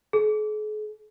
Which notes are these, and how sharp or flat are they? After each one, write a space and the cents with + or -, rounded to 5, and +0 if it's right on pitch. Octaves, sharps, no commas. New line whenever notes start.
G#4 +45